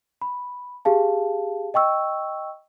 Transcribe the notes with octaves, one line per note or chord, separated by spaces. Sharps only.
B5
G4 G#4 F5 A5
D#5 G5 C#6 E6